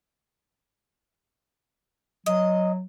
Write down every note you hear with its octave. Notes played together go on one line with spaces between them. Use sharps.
F#3 D#5